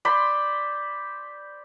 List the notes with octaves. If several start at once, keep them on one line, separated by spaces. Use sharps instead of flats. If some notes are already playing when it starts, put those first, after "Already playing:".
C5 D5 B5 C6